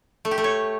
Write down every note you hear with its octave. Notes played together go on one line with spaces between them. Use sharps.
A3
G4
A3
C#5